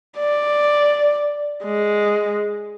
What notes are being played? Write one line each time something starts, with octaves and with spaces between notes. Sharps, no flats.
D5
G#3